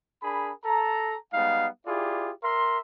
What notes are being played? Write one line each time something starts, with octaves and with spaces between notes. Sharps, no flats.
D4 G#4 A#4 B5
A4 A5 A#5
G3 G#3 B3 D#4 F5
E4 F4 G4 G#4 D5
A#4 E5 C6